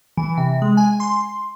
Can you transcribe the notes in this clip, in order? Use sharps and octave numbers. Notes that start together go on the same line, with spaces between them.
E3
C3
G#3
G#5
C6